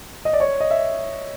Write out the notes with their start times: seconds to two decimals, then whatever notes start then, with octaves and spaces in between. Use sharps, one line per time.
0.25 D#5
0.33 D5
0.40 C#5
0.60 D#5
0.71 E5